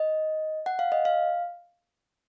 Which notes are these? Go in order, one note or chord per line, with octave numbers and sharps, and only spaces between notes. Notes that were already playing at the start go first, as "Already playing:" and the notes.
Already playing: D#5
F#5
F5
D#5
F5